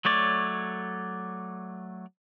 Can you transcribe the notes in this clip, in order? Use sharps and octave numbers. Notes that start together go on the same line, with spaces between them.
F#3 A3 C#5 D5